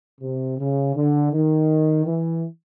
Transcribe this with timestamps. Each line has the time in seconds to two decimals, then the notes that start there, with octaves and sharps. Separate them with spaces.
0.21 C3
0.58 C#3
0.96 D3
1.33 D#3
2.06 E3